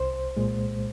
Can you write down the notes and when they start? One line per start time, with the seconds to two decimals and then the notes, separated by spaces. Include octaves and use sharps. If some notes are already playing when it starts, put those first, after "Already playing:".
Already playing: C2 C5
0.37 A#2 G#3